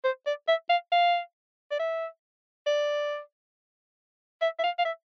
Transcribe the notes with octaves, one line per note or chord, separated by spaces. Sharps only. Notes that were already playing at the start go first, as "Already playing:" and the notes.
C5
D5
E5
F5
F5
D5
E5
D5
E5
E5
F5
F5
E5